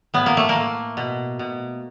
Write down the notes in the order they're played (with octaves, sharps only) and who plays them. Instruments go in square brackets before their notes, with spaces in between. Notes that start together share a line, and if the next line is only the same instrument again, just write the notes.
[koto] A2 B3
A#3
A3
A#3
A3
B2
B2